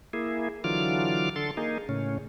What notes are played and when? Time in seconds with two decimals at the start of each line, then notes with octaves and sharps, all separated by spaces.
0.13 A#3 E4 G#4
0.64 D3 E3 F#3 F4 D6 F6
1.36 D3 A4 C6 A6
1.57 A#3 D#4 G#4
1.89 A2 C#3 C#4